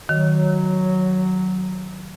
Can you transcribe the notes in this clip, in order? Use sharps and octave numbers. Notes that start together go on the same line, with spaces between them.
D#3 F#3